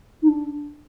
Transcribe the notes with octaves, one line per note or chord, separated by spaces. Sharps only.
D#4
D4